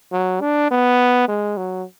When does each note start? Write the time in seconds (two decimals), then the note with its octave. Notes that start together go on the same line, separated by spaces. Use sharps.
0.12 F#3
0.41 D4
0.71 B3
1.28 G#3
1.57 F#3